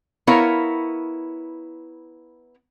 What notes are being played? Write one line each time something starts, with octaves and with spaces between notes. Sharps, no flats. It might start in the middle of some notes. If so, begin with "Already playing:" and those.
B3 E4 A#4 C#5 F5